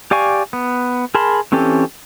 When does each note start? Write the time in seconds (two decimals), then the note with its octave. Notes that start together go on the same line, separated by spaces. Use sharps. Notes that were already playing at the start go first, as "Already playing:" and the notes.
0.11 G4 D5 F5 G#5 C#6
0.53 B3
1.15 G#4 A#4 A5 B5 C6
1.52 E3 C4 C#4 G4 A4